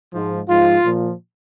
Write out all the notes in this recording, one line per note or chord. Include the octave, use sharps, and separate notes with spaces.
G#2 F3
G#2 F3 F4
A#2 F3